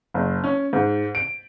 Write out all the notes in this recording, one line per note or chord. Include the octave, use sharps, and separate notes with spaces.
F#1
C#4
G#2
D7